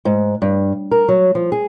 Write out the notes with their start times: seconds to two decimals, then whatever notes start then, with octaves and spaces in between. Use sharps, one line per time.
0.05 G#2
0.42 G2
0.91 A#4
1.09 F#3
1.35 F3
1.52 G#4